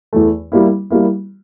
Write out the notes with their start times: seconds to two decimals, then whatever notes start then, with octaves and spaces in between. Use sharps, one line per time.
0.13 E2 E3 A3
0.52 G3 A#3 E4
0.90 G3 A#3 E4